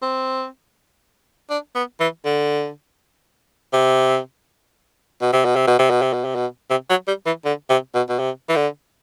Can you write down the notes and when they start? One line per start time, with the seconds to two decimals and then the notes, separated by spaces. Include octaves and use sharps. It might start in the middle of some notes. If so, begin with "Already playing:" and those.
0.02 C4
1.50 D4
1.75 B3
2.00 E3
2.25 D3
3.73 C3
5.21 B2
5.33 C3
5.45 B2
5.56 C3
5.67 B2
5.79 C3
5.90 B2
6.02 C3
6.13 B2
6.25 C3
6.35 B2
6.70 C3
6.89 F#3
7.07 G3
7.26 E3
7.45 D3
7.70 C3
7.94 B2
8.09 B2
8.19 C3
8.49 E3
8.56 D3